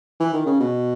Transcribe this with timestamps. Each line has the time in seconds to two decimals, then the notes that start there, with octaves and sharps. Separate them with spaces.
0.20 E3
0.33 D#3
0.46 C#3
0.60 B2